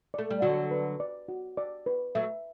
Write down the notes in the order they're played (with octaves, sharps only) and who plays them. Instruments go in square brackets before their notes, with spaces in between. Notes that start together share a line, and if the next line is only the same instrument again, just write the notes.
[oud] A3 [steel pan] D5
[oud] G3
[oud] D3 F#3 [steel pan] F#4
[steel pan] B4
D5
F#4
D5
B4
[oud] F#3 A3 [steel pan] E5